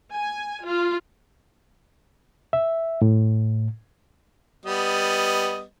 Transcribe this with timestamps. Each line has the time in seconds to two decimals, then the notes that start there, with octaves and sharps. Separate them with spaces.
0.12 G#5
0.65 F4
2.53 E5
3.02 A2
4.65 G3 B3 D#5